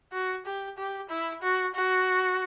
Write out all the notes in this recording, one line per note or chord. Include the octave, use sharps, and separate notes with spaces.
F#4
G4
G4
E4
F#4
F#4